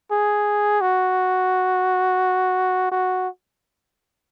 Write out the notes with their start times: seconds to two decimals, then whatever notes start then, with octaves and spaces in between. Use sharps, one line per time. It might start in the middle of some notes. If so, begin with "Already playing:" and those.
0.11 G#4
0.81 F#4
2.92 F#4